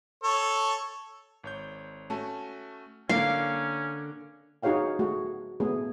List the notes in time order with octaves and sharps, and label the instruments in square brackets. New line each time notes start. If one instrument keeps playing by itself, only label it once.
[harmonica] A4 C#5
[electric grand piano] G#1 C#5 G6
[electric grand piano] A3 C#4 F#4 [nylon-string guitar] A5
[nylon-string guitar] D3 A#3 [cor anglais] C#4 [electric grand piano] A#4 [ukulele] F5
[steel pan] D#4 F#4 G#4 C#5 F5 G5
A3 F#4 G#4
A3 B3 G#4